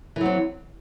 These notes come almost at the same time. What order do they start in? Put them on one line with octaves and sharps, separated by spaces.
E3 F#3 C4